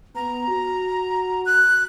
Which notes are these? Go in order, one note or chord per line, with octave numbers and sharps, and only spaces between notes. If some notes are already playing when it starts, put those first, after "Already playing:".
B3 A#5
F#4
F#6